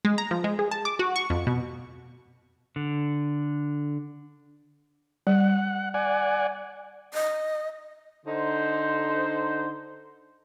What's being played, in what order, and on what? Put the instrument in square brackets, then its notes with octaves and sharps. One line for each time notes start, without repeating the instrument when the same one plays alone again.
[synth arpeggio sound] G#3
A#5
F3
G#3
G#4
A5
D6
F#4
C#6
F2
B2
[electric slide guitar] D3
[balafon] G3 [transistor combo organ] F#5
[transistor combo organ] D5 F#5 G#5
[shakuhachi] D#5
[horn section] D3 D#4 C5